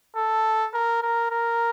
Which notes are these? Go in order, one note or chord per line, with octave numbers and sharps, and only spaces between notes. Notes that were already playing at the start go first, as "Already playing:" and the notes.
A4
A#4
A#4
A#4